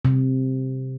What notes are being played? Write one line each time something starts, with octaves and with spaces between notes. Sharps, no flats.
C3